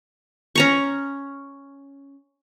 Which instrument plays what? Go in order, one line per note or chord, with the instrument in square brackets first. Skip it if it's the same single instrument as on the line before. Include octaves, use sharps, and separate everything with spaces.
[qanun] C#4 A#5 C#6